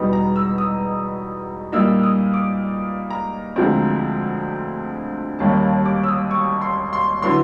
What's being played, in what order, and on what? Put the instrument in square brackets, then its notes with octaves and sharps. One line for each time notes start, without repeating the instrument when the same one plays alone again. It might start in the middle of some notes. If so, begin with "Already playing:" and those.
Already playing: [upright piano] E2 B2 G3 B3 D#4
A#5
E6
D#6
A#2 G3 A#3 D#4 E6
D#6
D6
A#5
D2 D3 F3 G#3 C4
D#2 D#3 G3 A#3 C#4 A5
A5
D6
E6
D#6
C#6
C6
C6
D3 F#3 B3 E4 C6